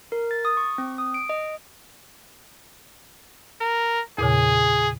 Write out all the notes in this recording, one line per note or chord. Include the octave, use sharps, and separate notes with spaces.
A#4
A6
D#6
C#6
C4
D#6
D7
D#5
A#4
E2 A#2 C#3 G#4